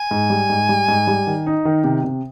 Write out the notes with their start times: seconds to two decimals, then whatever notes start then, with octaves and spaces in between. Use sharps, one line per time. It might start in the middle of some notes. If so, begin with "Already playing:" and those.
Already playing: G#5
0.11 G#2
0.30 G3
0.50 G#2
0.69 G3
0.88 G#2
1.07 G3
1.27 D#3
1.46 D#4
1.65 D#3
1.84 C3
2.04 C3